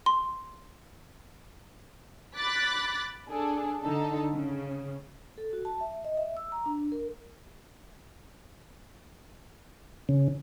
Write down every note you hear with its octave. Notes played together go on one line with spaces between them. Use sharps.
C6
B5 D6 F#6 A6 B6
D4 G#4 A4
D3 D#4 A4
C#3
A4
F#4
A5
E5
D#5
E5
E6
A#5
D4
A#4
C#3